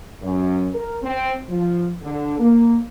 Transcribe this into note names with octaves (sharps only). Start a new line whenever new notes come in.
F#2
A#4
C4
F3
D3
A#3